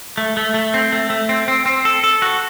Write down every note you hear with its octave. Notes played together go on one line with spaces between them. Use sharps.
A3
A3
A3
C4
A3
A3
C4
C4
C4
A4
A4
F#4